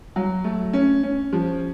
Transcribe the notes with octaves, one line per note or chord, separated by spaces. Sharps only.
F#3
A3
C#4
C#4
F3